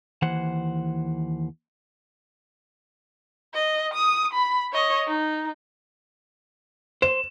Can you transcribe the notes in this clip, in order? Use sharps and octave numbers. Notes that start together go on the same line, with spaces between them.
D#2 E3 C5 F#5
D#5
D#6
B5
C#5 D#5
D#4
C5 E7